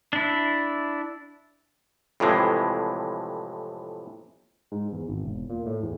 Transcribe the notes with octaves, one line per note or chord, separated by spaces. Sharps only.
D4 E4
F2 A2 C3 E3 G#3
G#2
E2
G#1
E1
A#2
A2
E2